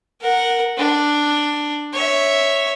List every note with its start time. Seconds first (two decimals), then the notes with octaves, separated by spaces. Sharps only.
0.21 A#4 F#5
0.78 D4
1.94 C#5 E5